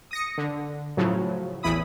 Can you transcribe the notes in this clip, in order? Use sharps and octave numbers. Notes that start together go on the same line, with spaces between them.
D#6 A#6 C#7
D3
A2 C#3 F3 F#3
A1 E2 E4 B5 D#6